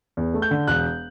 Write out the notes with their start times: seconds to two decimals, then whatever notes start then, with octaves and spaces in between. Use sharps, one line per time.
0.17 E2
0.34 A3
0.42 G6
0.51 D3
0.68 E1 F#6